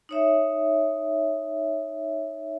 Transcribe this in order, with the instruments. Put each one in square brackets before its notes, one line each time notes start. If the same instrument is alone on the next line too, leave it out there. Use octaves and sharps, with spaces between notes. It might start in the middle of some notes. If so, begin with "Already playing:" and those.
[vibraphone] D#4 C#5 E5